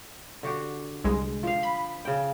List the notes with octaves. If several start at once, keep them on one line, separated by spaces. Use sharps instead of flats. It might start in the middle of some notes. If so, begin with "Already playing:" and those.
D3 F#4 G4
C2 G#3
F3 F5
B5
C#3 G5